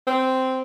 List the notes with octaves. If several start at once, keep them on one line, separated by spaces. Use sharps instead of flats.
C4